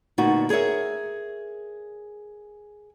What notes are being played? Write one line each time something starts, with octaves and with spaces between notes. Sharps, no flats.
D2 A#2 B3 D#4 F#4
G#4 A#4 C#5 E5